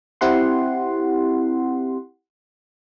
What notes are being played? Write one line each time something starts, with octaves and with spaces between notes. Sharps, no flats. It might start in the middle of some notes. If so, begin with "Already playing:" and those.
C4 E4 G4 F#5 C6